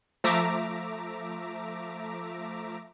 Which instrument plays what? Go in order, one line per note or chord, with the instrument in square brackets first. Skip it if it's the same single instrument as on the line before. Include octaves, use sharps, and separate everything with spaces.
[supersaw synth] F3 A3 E5 A#5 D6